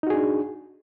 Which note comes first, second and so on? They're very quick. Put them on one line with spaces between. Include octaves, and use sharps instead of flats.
D#4 F#4 G#4 D4